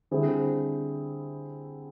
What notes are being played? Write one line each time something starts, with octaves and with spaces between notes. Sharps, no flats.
D3 G3 C4 E4 G#4